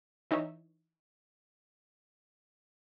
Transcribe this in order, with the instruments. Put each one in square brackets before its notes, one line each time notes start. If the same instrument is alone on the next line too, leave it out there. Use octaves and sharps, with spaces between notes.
[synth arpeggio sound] E3 D#4 C#5 E5